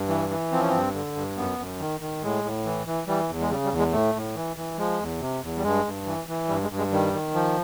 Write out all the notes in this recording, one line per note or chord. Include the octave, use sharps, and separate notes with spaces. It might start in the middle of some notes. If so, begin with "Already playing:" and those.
Already playing: G2
E3
E3
F3 C4
C#4
G2 C4
D3
G2
F#2 B3
F#2
D#3
D#3
A2 G#3
A2
E3
E3
E3 G3
E2
G#3
C#3 G3
G3
E2
G#3
A2 A3
A2
E3
E3
F3 G#3
E2
C3
E2
G3
G2 G#3
G2
E3
E3
G2 G3
G#3
G2
G#3
D#3 G3
D#3
F3